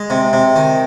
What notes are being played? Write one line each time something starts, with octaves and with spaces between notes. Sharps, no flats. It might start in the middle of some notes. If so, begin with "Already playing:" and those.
Already playing: G#3
C3
C3
D#3